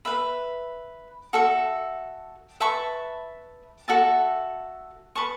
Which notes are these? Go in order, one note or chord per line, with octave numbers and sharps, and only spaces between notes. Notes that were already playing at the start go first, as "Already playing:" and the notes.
B4 E5 B5
F#4 A4 E5
B4 E5 A5 C#6
F#4 A4 E5 A5
B4 A5 C#6